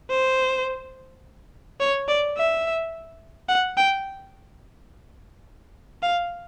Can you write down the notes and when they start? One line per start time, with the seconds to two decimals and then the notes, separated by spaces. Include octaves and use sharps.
0.11 C5
1.80 C#5
2.08 D5
2.37 E5
3.49 F#5
3.77 G5
6.03 F5